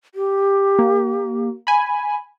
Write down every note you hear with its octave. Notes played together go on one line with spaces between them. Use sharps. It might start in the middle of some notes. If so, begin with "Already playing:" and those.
G4
A#3
G#5 B5